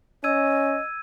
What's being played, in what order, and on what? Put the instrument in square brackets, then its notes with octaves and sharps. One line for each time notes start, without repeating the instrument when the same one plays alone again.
[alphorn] C#4 [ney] D#5 [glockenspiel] E6 G#6 D#7